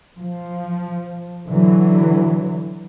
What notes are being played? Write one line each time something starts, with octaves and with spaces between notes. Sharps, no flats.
F3
D3 E3 F#3